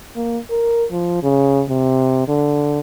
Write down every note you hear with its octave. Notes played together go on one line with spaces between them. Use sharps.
A#3
A#4
F3
C#3
C3
D3